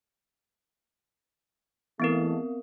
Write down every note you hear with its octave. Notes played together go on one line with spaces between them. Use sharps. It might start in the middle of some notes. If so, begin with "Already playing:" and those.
E3 G#3 A3 B3 C4 A#4